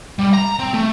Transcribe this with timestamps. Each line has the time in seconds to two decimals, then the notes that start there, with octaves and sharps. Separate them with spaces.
0.19 G3
0.34 A#5
0.59 C4
0.74 A3